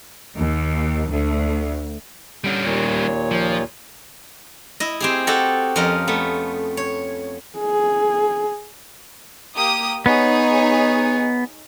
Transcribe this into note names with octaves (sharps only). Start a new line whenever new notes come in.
D#2
D2
D3 G3 C#4
D#2 A#2 C#5
F3
E4 D#5
C4 G4 G#4
F#4 G4 A4 D#5
F2 C#4 F4 A#4 D#5
A3 B3
C#5
G#4
A#3 G4 D#6
B3 D#4 G#4 C#5